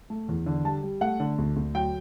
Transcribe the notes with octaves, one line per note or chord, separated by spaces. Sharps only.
A3
E2
D3
G3 A5
G3
A3 F#5
D3
D2
D2
F#3 G5